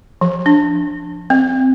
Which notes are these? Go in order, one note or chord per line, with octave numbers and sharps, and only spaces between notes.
F3
D4
C4